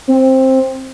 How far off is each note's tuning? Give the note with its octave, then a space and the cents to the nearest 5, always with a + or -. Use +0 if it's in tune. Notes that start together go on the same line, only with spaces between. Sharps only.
C4 +10